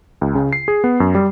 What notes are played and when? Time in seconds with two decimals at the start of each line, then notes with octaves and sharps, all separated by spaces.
0.21 C#2
0.35 C#3
0.53 C7
0.68 G#4
0.84 B3
1.00 F#2
1.15 G3